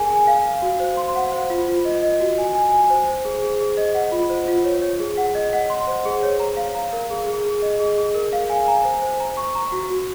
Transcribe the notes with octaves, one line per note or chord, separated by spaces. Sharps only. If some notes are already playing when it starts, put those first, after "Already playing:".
Already playing: G#4 A#4 G#5
G#5
F5
F5
F#4
C5
C6
F#5
C5
F4
F4
D#5
D#5
F#4
G#5
G#5
G#5
C5
C5
G#4
G#4
G#4
D#5
F#5
F4
C5
F4
C#5
C#5
G#4
F#5
D#5
F#5
C6
C5
G#4
C#5
A#5
F5
A#5
A#4
G#4
G#4
G#4
D#5
G#4
G#4
A#4
F5
G#5
A#5
C5
C5
A#5
C#6
A#5
F#4
F#4